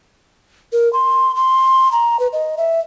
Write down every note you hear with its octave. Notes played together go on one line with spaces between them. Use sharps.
A#4
C6
C6
A#5
B4
D#5
E5